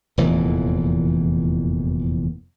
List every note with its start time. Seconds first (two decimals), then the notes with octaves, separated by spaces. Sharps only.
0.18 F1 E2 A#2 E3